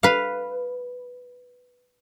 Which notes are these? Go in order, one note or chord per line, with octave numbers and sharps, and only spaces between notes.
B4 F5